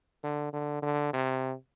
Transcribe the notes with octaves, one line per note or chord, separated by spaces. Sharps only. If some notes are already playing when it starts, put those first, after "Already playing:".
D3
D3
D3
C3